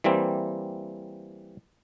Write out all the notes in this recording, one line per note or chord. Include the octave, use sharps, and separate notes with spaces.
E3 G3 A#3 C4